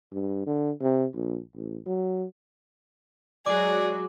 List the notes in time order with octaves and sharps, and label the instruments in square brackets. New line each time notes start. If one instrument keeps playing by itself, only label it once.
[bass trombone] G2
D3
C3
A#1
A1
F#3
[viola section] F#3 G#3 F#4 [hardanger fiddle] G#4 [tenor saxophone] D5 [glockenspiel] D6